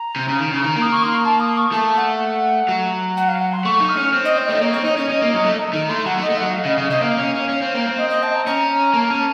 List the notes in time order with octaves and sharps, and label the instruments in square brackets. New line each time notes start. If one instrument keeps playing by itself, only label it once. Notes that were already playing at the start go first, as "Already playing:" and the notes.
Already playing: [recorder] A#5
[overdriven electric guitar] C3
C#3
D#3
C#3
D#3
A#3
[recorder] D#6
C#6
C6
A#5
A5
D#6
C#6
[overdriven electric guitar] A3 [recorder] A5
[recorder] F#5
[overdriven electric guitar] F#3
[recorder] F#5
F5
F#5
C6
[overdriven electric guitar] A3 [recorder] C#6
[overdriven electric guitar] D#4
[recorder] F6
[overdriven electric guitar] C#4
C4
[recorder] D#5
C#5
[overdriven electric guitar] A3 [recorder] D#5
[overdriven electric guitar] A#3 [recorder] C#5
[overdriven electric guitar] C4 [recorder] C#5
[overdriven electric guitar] D#4 [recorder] D#5
[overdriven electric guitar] C#4 [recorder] C#5
[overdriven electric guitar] C#4 [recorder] D#5
[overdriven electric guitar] A#3
F#3
A3
[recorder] A#5
[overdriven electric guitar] D#3 [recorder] A#5
[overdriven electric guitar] A3 [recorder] C6
[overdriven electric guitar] F#3 [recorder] F#5
[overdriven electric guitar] A3
[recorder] D#5
[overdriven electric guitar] A3
[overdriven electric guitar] F#3 [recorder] F#5
[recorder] F5
[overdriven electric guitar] C#3 [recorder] D#5
[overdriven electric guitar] C#3
[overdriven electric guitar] C3 [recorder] D#5
[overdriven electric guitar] A#3 [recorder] F5
[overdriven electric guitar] C#4
C#4
C#4
C4
A#3
C4
[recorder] D#5
D#5
A5
A#5
[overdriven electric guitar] C#4 [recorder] A#5
[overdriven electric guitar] A#3 [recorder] A5
[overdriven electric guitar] C#4